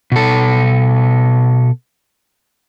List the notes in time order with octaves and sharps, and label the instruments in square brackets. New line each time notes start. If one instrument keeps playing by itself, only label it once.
[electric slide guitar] B2 A4